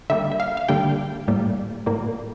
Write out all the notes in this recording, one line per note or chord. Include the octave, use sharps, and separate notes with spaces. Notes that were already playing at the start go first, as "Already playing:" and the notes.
D3 G3 A#3 E5
E5
F5
F5
D3 G3 A#3 G5
A2 G3 A#3
A2 G3 A#3